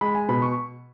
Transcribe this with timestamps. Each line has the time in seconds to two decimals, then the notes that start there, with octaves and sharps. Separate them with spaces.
0.01 G#3 B5
0.15 G#5
0.28 B2 B5
0.42 C#6